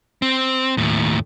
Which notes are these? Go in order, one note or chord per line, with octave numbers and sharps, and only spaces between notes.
C4
D#2 A2